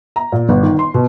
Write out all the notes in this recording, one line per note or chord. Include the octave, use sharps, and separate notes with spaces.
A#5
A#2
G1
D#3
C6
B2